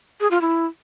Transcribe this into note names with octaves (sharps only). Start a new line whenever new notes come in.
G#4
F4
E4